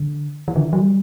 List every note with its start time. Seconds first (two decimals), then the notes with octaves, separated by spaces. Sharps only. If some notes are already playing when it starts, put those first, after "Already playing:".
Already playing: D3
0.48 E3
0.56 D3
0.64 E3
0.73 F#3
0.80 G3